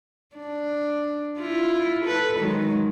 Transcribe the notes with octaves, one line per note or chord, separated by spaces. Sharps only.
D4
E4 F4
A4 B4
D#3 F#3 G#3